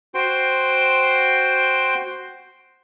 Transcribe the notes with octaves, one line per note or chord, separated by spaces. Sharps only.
F#4 C5 G5 C6